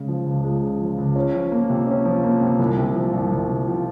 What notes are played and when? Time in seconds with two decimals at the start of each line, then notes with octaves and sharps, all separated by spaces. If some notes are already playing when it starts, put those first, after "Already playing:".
Already playing: C#3 G#3
0.08 F3
0.26 C#2
0.44 G#3
0.62 C#3
0.80 F3
0.98 C#2
1.16 C#4
1.34 F3
1.52 A#3
1.70 C3
1.87 C#4
2.05 F3
2.24 A#3
2.41 C3
2.59 C2
2.77 C3
2.95 F3
3.13 C2
3.31 C2
3.49 C3
3.67 F3